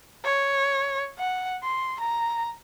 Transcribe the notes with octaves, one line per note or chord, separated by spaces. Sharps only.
C#5
F#5
C6
A#5